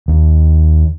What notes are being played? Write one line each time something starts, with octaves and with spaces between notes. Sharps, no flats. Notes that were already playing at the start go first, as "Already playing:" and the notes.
D#2